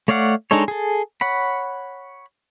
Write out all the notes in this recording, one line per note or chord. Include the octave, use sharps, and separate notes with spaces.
A3 C#5 D5 F5 F#5
G#3 D4 D#4 A4 C#5
G#4 A4
C#5 F#5 B5